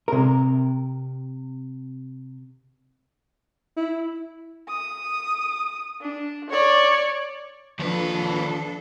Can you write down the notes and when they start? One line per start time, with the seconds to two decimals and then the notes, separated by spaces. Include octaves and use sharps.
0.08 C3 A#4
3.77 E4
4.69 D#6
6.01 D4
6.50 C#5 D5
7.80 D#2 F3 D4 A4 B4